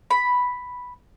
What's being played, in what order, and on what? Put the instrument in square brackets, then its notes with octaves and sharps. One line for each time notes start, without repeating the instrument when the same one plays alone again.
[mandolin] B5